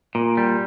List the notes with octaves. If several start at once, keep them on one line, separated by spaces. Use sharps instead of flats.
A#2
G3